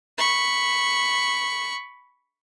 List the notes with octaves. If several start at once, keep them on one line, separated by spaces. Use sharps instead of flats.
B5 C#6